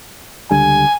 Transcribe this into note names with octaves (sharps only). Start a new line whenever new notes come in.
C#2 D3 G3 G#5